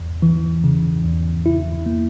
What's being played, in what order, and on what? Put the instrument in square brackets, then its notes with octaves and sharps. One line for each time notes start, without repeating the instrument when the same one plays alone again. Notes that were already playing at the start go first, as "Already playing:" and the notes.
Already playing: [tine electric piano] E2
E3
C#3
E2
E4
A#3